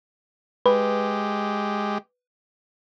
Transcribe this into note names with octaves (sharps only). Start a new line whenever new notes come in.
G#3 G4 B4